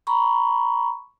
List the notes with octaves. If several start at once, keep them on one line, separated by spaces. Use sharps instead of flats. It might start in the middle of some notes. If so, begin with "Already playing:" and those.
A#5 B5 C#6